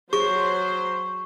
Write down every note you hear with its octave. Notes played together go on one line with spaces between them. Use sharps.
F#3 G#4 C5 C#6